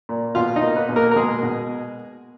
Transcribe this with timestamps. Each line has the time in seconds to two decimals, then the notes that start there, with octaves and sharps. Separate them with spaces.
0.09 A#2
0.35 B2 F4 F5
0.56 D#4 D#5
0.62 A#3
0.75 B3 B4
0.89 B2
0.96 A#3 A#4
1.11 A#4
1.16 B2 G#3 G#4
1.43 B2